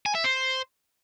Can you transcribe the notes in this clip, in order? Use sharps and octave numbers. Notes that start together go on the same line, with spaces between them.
G#5
E5
C5